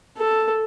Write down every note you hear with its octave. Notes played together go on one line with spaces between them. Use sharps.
A4